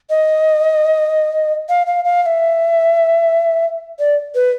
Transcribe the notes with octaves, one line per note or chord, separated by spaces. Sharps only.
D#5
F5
F5
F5
F5
E5
D5
B4